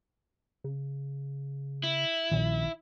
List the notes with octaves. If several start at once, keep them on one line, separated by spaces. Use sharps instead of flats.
C#3
E4
A#1 A#2 D#3